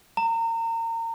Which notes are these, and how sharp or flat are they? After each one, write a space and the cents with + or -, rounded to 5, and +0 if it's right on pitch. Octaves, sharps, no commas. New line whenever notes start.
A#5 -30